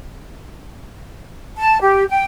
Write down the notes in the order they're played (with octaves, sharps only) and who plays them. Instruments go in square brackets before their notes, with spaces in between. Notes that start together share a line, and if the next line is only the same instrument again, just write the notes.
[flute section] A5
G4
G5